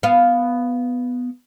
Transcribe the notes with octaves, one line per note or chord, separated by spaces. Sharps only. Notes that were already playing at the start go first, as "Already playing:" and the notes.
B3 F5